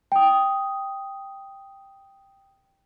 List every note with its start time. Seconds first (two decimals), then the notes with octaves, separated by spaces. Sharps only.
0.12 G5 D#6